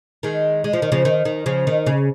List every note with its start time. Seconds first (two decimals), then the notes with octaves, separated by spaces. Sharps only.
0.23 D#3 G#3
0.64 G#3
0.73 F3
0.82 D#3
0.92 C#3 F3
1.05 D#3
1.25 D#3
1.46 C#3 F3
1.67 D#3
1.86 C#3